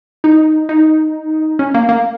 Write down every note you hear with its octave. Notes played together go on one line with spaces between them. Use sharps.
D#4
D#4
C#4
A#3
A#3